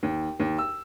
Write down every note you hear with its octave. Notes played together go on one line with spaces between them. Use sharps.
D#2
D#2
E6